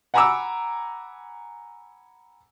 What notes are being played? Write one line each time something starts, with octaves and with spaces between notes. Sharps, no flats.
F#5 G#5 A#5 B5 D6 E6